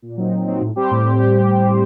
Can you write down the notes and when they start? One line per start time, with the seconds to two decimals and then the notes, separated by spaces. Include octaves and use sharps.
0.02 A#2
0.17 F#3 C4 D#4
0.32 A#2
0.47 F#3 C4 D#4
0.61 A2
0.76 G3 C4 G4 C5
0.91 A2